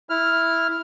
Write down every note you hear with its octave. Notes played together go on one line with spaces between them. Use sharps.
E4 F6